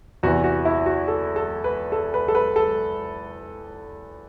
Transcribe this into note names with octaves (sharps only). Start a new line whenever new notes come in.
E2 C3 E3 F#4
F#4
E4
F#4
A4
A4
B4
A4
B4
A4
B4
A4